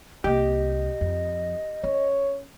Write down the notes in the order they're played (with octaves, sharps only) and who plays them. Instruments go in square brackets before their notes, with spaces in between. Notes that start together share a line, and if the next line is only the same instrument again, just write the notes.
[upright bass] C2 A#3 [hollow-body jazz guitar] G4 [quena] D#5
[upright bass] F2
[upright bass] C#4 [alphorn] C#5